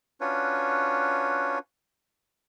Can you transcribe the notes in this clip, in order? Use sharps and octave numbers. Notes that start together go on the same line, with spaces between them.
C#4 D4 F4 F#4 B4 C#5